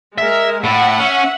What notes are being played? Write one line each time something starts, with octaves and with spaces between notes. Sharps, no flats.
G#3 A#4 E5
A2 E5 F#5
C#4